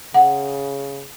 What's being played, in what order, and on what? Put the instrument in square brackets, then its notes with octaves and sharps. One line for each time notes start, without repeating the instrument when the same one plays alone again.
[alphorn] C#3 [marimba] F#5